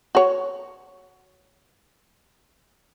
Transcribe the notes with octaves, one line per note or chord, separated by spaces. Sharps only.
F#4 C#5